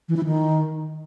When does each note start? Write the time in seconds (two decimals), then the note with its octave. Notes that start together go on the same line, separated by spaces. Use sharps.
0.09 E3
0.17 E4
0.25 D#3